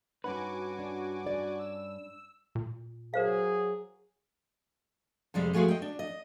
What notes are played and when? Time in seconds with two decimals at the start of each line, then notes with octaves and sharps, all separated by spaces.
0.24 G2 C#4 D#4 F#4 B4 G#5 D6
0.79 D4
1.24 D4 D5
1.59 E6
2.55 A#2
3.14 F#3 G#4 A#4 C5 F5
5.34 F2 C3 G3 G#3
5.53 F3 G#3 A3 F#4 G#4
5.68 D#5 G5
5.82 D4
5.99 D#5